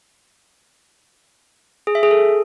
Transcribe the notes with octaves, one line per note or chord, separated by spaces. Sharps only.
G#4
E5
G#4
A4